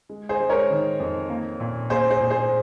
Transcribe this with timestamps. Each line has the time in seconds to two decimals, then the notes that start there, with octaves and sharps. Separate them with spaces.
0.09 G#3
0.29 G#4 C5
0.40 G#3
0.49 A#4 C#5
0.70 D#3
1.00 F2
1.30 A#3
1.60 A#2
1.90 A#3 G#4 C5
2.10 G#4 C5
2.20 A#2
2.30 G#4 C5